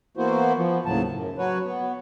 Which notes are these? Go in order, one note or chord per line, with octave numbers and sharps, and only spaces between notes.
E3 A#3 B3 E4 F#4 C5
F3 B3
D#2 A2 C#3 F#3 A5
F#2
F#3 F#4 B4 C#5
B3